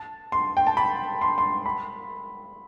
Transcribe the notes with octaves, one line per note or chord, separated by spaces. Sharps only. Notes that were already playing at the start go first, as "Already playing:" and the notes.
Already playing: A5
C6
G5
A5
B5
C6
C6
B5